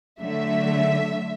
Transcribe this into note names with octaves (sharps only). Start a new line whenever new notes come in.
D3 F#3 A3 E5